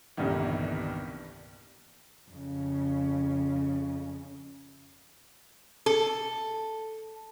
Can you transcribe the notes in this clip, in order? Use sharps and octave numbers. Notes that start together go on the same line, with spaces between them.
G1 C2 G2 A#2 D#3 E3
F2 C#3
A4